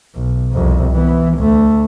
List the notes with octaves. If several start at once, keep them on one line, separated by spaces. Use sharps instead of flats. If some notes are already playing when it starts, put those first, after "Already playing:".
B1
C2 F2
E3 B3
D2 A3